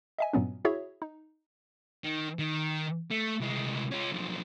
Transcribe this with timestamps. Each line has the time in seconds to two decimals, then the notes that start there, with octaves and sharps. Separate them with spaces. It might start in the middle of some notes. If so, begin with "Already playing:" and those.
0.18 D#5 E5 G#5
0.33 G2 A#2 F#3 B3 C#4
0.65 E4 F#4 G#4 C#5 E5
1.02 D#4
2.04 D#3
2.39 D#3
3.11 A3
3.41 C2 G#3
3.92 C#4 F4
4.12 B1 F3